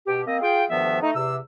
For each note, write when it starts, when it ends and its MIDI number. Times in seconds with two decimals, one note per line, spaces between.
0.06 0.22 47
0.06 0.22 67
0.26 0.37 58
0.26 0.37 60
0.26 0.37 75
0.41 0.64 65
0.41 0.64 68
0.41 0.64 79
0.71 1.01 38
0.71 1.01 43
0.71 1.01 51
0.71 1.01 53
0.71 1.01 59
0.71 1.01 76
1.02 1.11 57
1.02 1.11 63
1.15 1.36 40
1.15 1.36 48
1.15 1.36 88